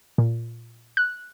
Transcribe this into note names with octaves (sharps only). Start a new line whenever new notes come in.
A#2
F#6